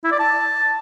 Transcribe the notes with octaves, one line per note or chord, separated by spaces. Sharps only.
E4
D5
A5